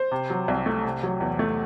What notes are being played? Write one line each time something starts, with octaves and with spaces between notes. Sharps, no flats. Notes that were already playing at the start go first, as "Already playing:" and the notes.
Already playing: C5
C3
F#3
C2
A3
C3
F#3
E2
A3